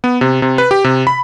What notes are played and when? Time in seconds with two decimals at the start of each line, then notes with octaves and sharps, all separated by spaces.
0.04 B3
0.21 C3
0.42 C3
0.58 B4
0.71 G4
0.84 C3
1.07 B5